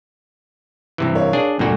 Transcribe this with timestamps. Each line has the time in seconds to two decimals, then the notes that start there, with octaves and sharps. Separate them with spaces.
0.98 G2 C3 E3
1.15 A#4 C#5 F5
1.33 D4 G#4
1.59 D2 G2 A#2 D4 F#4 A4